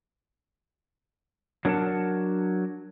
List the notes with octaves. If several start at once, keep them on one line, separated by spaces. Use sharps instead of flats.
F#3 D4 A#4 E5 F#5 A5